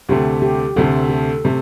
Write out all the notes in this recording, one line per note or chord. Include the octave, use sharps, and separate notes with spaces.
D2 C3 A3 G4
G4
D2 C3 A3 A4
A4
C3 A3